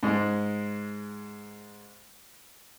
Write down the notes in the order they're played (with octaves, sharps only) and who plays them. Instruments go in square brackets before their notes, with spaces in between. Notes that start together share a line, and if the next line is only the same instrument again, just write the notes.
[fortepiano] G#2 G#3